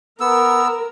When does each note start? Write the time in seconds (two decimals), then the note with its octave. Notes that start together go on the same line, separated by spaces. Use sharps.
0.20 B3 A#4 E6